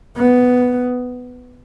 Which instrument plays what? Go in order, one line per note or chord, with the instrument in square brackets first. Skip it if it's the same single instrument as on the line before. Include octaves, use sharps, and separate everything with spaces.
[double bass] B3